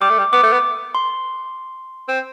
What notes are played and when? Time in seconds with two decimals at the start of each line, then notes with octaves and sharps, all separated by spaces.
0.01 G3 D6
0.09 A3
0.18 G3
0.33 B3 D6
0.43 A3
0.52 B3
0.95 C6
2.08 C4